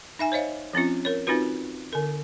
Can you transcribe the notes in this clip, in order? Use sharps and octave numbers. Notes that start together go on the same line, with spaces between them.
D#4 E5 G#5
C5 C#5 D#5 F5
F3 C4 C#4 F4
A#4 C#5
C4 D#4 F4 F#4 B4
D3 A#4